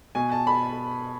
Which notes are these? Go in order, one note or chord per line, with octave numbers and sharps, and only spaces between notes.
B2 G#5
A5
B5